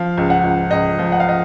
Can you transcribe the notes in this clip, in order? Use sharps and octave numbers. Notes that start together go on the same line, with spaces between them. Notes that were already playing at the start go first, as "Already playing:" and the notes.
Already playing: F3 F5
C#2
F#5
C#2
C#2 D#5
F3
F#5
F5
D#5